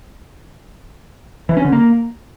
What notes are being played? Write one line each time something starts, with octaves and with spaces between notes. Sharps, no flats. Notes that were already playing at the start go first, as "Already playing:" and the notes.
E3
C#4
D3
A#3